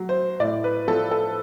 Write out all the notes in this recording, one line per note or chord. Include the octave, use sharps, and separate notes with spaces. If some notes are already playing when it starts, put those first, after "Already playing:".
Already playing: F#3
C5
A2 D5
B4
F3 A4
A4